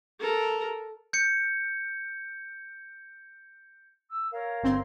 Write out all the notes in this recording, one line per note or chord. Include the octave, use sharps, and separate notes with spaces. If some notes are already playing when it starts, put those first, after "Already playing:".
A4 A#4
G6 C#7
E6
A#4 C#5 F5
G1 C4 C6